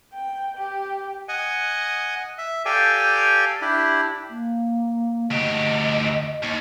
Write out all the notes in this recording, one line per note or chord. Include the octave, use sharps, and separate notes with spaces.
G5
G4
D#5 F#5 G#5
E5
G4 A4 D5 F5 G5 G#5
D4 E4 G4
A#3
D2 G4 D#5
D#2